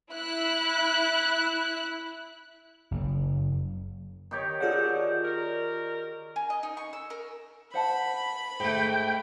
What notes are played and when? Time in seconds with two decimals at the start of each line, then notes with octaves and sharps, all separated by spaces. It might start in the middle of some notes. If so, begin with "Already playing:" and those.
0.11 E4 F#6
2.91 F#1
4.31 D#3 G4 C#5
4.61 D3 F#3 F4 G#4 D5 F#5
5.24 A#4
6.36 G#5
6.50 D#5
6.63 D#4
6.77 C#6
6.93 E6
7.10 A#4
7.74 C5 F#5 A5 B5
8.60 G#2 A3 G5